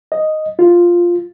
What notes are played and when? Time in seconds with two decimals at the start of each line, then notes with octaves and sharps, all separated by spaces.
0.12 D#5
0.59 F4